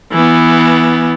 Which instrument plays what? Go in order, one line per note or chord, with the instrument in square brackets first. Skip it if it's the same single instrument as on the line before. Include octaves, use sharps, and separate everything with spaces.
[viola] E3 B3